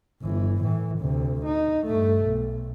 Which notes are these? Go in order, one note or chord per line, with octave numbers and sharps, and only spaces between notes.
G1 E3
A2 E3
D2 C3
D#4
G2 A3
B1